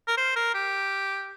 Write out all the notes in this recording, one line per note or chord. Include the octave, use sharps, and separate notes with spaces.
A#4
C5
A#4
G4